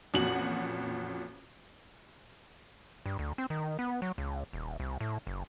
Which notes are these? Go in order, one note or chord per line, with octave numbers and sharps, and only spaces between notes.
A1 F2 A#2 F#4 F#5 F#7
G2
D2
C4
D#3
B3
F#3
C#2
D#1
C2
A2
F#1